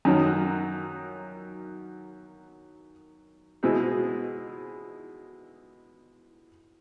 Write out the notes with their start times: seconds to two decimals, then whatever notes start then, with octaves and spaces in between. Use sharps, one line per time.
0.05 F#2 D#3 F#3
3.63 B2 G#3 C4 E4